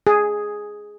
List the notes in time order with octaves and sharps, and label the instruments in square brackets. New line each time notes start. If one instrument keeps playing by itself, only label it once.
[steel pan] G#4